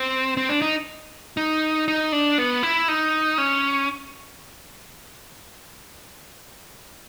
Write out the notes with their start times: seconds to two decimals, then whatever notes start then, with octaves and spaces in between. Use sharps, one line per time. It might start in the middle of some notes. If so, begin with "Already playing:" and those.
Already playing: C4
0.37 C4
0.49 D4
0.62 D#4
1.37 D#4
1.88 D#4
2.12 D4
2.38 B3
2.63 E4
2.88 D#4
3.38 C#4